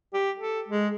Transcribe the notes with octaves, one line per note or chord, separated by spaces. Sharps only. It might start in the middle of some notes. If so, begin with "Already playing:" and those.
G4
A4
G#3